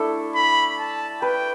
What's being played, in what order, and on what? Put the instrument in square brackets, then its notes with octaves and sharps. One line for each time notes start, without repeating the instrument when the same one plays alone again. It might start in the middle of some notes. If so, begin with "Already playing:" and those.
Already playing: [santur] A3 D4 E4 A4
[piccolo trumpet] B5
A5
[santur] B4 [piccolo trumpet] G5